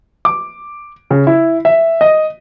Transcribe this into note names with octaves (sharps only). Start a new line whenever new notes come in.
D6
C#3
E4
E5
D#5